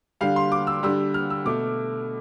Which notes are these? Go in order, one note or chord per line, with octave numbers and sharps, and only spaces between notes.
D3 G3 F5
C6
D6
E6
D3 G3 E6
F6
E6
B2 A3 D6